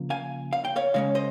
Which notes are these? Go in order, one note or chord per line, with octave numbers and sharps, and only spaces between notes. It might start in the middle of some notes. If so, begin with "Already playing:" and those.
Already playing: C#3 F3 A#3 C#4
F5 G#5
F5
G5
C#5 F5
C#3 G#3 C#4 C#5 F5
C5 D#5